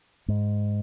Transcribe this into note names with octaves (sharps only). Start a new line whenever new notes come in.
G#2